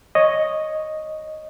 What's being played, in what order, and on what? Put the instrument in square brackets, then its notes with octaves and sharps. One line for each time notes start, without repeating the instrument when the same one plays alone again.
[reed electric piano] C#5 D#5